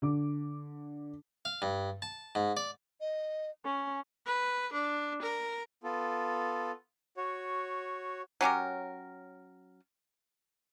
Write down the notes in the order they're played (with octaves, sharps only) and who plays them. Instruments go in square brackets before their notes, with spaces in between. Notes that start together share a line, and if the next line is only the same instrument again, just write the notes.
[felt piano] D3 D6
[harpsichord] F5
G2
A5
G#2
D5
[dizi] D#5
[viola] C#4 [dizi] G#5
[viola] B4
D4
A#4
[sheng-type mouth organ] B3 F4 A4
F#4 C#5
[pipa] F#3 C#4 G4 A#4